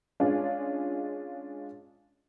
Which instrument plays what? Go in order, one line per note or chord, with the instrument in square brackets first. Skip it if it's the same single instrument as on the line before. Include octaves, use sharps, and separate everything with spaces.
[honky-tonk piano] G#3 C#4 D4 F4